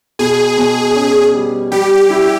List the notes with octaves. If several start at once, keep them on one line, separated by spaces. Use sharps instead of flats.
B2 G#4
B2
C#4
G3
G3 G4
E4